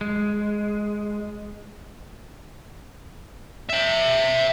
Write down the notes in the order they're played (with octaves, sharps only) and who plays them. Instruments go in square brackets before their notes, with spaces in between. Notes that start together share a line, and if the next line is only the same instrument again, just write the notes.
[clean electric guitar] G#3
[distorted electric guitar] E5 G5